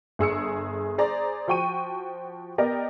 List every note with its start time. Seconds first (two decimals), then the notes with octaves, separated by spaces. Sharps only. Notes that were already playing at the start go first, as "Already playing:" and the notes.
0.19 G1 G#4 E6 C#7
0.98 G#4 C5 D5 A#5
1.48 F3 F#4 G5 C#6 D#7
2.58 B3 G4 A#4 D5 D#5